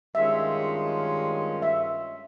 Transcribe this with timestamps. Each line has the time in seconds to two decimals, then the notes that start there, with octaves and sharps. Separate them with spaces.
0.15 G2 D#3 G#3 C#4 F4 E5
1.62 E5